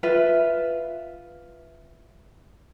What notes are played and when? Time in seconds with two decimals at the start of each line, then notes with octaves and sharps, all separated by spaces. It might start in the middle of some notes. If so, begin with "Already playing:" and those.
0.03 F4 B4 E5